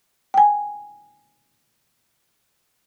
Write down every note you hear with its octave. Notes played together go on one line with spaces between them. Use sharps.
G5 G#5